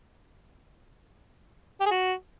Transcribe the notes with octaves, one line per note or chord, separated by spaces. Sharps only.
G4
G#4
F#4